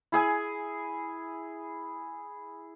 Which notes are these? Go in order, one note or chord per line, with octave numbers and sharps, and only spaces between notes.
E4 G#4 G#5